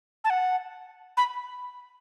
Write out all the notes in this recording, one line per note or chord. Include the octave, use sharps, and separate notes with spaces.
A5
F#5
B5